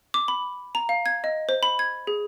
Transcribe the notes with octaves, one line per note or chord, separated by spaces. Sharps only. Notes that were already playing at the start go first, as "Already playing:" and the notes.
D6
B5
A#5
F5
G#6
D#5
C5
B5
G#6
G#4